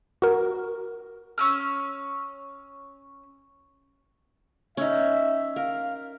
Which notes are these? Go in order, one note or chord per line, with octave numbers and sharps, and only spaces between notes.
F#4 A#4
C#4 E6 F6
C#4 D#4 E5
A#4 F5